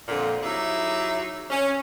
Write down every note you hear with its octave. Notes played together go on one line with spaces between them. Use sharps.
F2 A#2 D3
F#3 D#4 E4 G4 G#4 E5
C#4